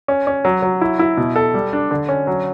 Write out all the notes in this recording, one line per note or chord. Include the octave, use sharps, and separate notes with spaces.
C#4
C#4
F#3
F#3
E4
E4
B2
A4
G3
D4
D3
C#4
F#3